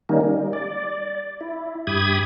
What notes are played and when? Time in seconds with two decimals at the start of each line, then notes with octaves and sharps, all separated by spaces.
0.09 D#3 G3 A#3 C#4 D#4
0.21 G3
0.53 D5
1.41 E4
1.87 G2 G4 B5 D#6 G#6